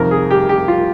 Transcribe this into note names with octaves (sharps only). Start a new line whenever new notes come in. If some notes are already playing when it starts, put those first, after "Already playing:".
Already playing: F2 C3 D#3 A#4
G#4
G4
G4
F4